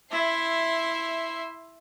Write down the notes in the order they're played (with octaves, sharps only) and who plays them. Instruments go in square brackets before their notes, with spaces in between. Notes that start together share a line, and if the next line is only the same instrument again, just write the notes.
[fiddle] E4 C6 [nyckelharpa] E5